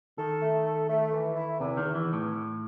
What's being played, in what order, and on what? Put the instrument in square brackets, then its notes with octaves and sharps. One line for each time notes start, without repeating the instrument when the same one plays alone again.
[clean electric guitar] D#3 [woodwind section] A4
[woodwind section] A3
A4
A3
E3
E4
[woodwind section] E2 [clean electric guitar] C3
[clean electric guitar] D#3
[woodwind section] E2
[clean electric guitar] E3
A2